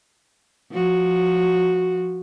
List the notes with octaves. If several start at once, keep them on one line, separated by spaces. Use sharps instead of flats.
F3 F#4